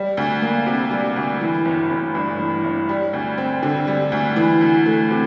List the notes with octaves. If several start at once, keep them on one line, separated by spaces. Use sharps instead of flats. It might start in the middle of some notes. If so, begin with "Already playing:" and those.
Already playing: G3
D2
A#3
C3
G3
D2
E3
G1
G1
G2
E3
G1
G3
D2
C4
D3
G3
D2
E3
D2
A3
C3